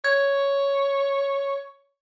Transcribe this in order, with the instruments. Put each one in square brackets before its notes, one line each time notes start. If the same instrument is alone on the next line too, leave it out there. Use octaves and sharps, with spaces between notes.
[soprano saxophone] C#5 [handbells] G#6